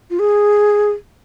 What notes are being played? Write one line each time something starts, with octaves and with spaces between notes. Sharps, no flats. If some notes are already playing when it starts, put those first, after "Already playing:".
F4
G#4